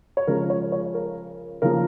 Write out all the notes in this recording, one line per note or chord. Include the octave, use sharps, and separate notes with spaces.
C#5
C#3 F3 G#3 C#4 A#4
C#5
C#5
A#4
C#3 F3 A#3 A#4